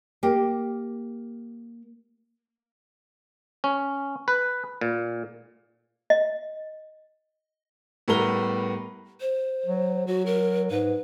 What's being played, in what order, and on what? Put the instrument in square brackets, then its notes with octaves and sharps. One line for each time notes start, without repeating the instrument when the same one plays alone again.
[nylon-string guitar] A#3 G4
[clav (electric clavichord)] C#4
B4
A#2
[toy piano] D#5
[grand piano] A2 G3 B3 A#4 A#5 G7
[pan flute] C5
[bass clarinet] F#3
[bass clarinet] F#3 [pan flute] F#4
[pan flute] A#4
[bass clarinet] G#2 [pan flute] B4